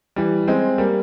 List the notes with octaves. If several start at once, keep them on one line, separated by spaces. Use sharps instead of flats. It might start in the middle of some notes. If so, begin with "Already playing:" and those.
E3 G3
G#3 C4
G3 A#3